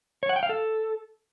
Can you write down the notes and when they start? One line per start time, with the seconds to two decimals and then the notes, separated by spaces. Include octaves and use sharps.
0.23 C#5
0.29 F#5
0.36 G5
0.43 F5
0.49 A4